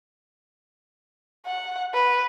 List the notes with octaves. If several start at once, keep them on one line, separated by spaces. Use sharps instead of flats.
F#5
B4